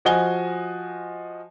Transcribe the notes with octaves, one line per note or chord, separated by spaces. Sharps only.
F3 F#4 D#5 G#5 G7